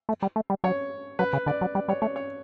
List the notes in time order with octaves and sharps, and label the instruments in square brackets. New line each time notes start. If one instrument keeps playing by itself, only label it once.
[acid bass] A3
G3
A3
G3
[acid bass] F#3 [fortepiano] C#5
[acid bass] F#3 [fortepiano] B4
[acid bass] C#3
[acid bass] D3 [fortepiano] D5
[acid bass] F#3
[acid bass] G3 [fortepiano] D5
[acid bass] G3 [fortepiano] C#5
[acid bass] A3 [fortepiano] C#5
[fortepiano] C#5